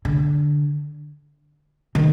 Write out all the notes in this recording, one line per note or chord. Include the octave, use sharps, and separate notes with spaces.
D3
D#3